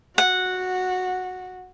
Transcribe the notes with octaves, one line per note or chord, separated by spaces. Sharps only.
F#4 F#5